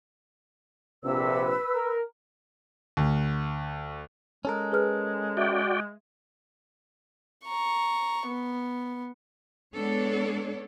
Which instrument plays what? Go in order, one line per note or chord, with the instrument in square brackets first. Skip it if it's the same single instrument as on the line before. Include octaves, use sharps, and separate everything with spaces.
[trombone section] A#1 C3 [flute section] B4 E6
[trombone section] A#4
[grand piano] D2
[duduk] G#3 [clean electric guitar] C#4 A4 A#4
[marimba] G#4 B4 F6
[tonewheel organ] F#4 D5 G5 [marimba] E5
[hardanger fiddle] A#5 C#6
B3
[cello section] G#3 B3 D4 A4 C#5 D5